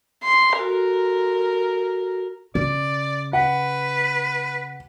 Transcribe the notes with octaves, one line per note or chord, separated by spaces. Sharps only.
C6
F#4 A4 A#4
C#3 D5
B4 F#5